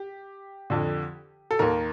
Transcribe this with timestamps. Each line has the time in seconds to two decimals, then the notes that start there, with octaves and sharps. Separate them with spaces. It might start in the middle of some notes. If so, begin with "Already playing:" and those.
Already playing: G4
0.70 F2 D3
1.51 A4
1.59 D#2 D#3 A#4